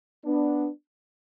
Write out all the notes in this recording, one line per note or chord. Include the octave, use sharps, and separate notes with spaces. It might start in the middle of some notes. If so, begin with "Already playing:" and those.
B3 D4